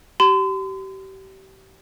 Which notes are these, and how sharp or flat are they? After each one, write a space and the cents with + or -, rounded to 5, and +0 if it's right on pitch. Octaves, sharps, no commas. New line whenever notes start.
G4 -35 C6 -40